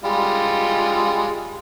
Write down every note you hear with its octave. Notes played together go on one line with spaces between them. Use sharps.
G3 G#3 F4